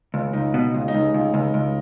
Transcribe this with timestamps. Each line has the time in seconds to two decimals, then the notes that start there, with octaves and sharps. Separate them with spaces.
0.14 C#2
0.33 C#2 D#4
0.54 B2
0.74 C#2
0.88 D#4
0.94 C#2
1.14 C#2
1.34 C#2
1.54 C#2